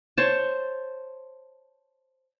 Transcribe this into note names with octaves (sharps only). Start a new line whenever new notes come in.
C5 C#5 A5